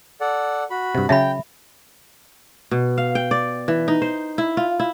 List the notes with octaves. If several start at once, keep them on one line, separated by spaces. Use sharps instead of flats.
A4 D5 F#5
F#4 B5
G2 C3
C#3 F#3 E5 G5 A5 B5
B2
F5
G5
D5
E3
D#4
C5
E4
F4
E4